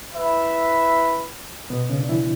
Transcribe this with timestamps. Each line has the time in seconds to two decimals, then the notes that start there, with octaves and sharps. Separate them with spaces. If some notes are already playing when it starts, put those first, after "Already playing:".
0.13 E4 B4 E5
1.70 B2 B3
1.89 C#3 C#4
2.00 D4
2.09 E3 E4